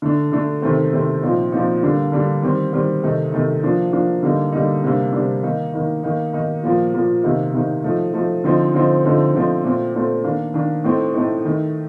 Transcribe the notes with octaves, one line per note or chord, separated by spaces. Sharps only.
D3 A3 D4
D3 A3 D4
C3 D#3 A3 C4
C3 D#3 A3 C4
A#2 F3 C4 D#4
A#2 F3 C4 D#4
D3 G3 A#3 D4
D3 G3 A#3 D4
D#3 G3 C4
D#3 G3 C4
C3 D#3 A3 D#4
C3 D#3 A3 D#4
F3 A#3 D4
F3 A#3 D4
D3 G3 A#3 D#4
D3 G3 A#3 D#4
C3 G3 A#3 D4
C3 G3 A#3 D4
D#3 A#3 D#4
D#3 A#3 D#4
D#3 A#3 D#4
D#3 A#3 D#4
A#2 F3 A#3
A#2 F3 A#3
C3 D#3 A#3 D#4
C3 D#3 A#3 D#4
F3 A3 D#4
F3 A3 D#4
D3 F3 C4 D#4
D3 F3 C4 D#4
D3 F3 A3 C4 D#4
D3 F3 A3 C4 D#4
A#2 A3 C4
A#2 A3 C4
D#3 A#3 D4
D#3 A#3 D4
A2 A3 C4 D#4
A2 A3 C4 D#4
D#3 A3 D#4